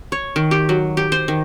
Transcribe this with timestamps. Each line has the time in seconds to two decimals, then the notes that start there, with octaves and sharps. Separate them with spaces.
0.12 C#5
0.36 D#3
0.51 G4
0.69 F#3
0.97 G4
1.12 C5
1.28 D#3